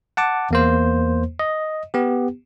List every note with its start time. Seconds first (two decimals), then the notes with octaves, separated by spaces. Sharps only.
0.17 F#5 A5 D6
0.51 E2 A#3 C5
1.39 D#5
1.94 B3 G4